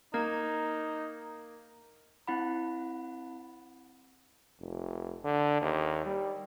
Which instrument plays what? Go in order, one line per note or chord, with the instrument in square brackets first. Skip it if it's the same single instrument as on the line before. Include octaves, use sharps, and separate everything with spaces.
[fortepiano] A#3 [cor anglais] D#4 [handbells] A#4 G#6
[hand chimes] C4 E4 F#5 B5
[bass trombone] F1
D3
D#2
G3